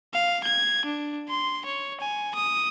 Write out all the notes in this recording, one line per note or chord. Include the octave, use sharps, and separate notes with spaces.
F5
G#6
D4
C6
C#5
G#5
D#6